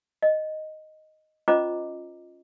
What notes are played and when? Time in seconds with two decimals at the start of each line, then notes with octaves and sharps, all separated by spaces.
0.22 D#5
1.48 C#4 F4 C5 D#5 A#5 D6